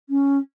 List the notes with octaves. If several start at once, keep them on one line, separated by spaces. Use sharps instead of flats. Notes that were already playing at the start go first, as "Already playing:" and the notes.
C#4